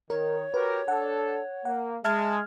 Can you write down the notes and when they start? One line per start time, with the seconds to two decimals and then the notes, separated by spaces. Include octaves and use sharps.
0.10 D#3 A#4 C#5
0.54 F#4 G4 A#4 B4
0.88 D4 A4 F#5
1.65 A#3 F#5
2.04 G#3 E5 A5 F6 G#6